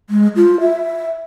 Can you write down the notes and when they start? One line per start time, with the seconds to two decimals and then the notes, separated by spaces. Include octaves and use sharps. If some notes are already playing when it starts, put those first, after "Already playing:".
0.10 G#3
0.36 F4
0.61 E5